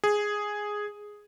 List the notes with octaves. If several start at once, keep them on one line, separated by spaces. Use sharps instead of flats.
G#4